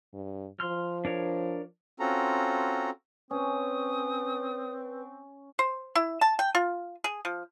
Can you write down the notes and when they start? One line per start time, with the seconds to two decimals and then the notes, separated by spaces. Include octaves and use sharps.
0.13 G2
0.60 F3 C6 F6
1.05 D4 A#4 C#5
2.00 C4 C#4 F4 F#4 A4 A#5
3.31 C4 C#4 B4 D#6
5.59 C5
5.95 E4
6.21 A5
6.39 G5
6.55 F4
7.04 G#4
7.25 F3